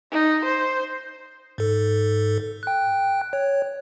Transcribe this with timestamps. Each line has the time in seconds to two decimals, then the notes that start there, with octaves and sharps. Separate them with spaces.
0.12 D#4
0.45 C5
1.58 G#2 A4
2.63 G5 F#6
3.33 C#5